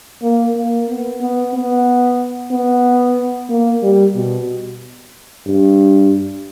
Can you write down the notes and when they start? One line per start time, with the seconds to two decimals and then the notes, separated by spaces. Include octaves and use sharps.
0.22 A#3
0.56 A#3
0.89 B3
1.21 B3
1.54 B3
2.51 B3
3.49 A#3
3.83 G3
4.15 B2
5.47 G2